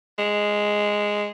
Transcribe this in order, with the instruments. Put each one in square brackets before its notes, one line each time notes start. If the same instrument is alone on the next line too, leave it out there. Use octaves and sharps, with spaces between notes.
[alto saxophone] G#3